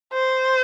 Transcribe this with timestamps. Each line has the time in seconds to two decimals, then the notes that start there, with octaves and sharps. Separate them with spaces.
0.13 C5